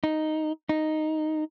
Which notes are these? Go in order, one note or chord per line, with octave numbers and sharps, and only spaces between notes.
D#4
D#4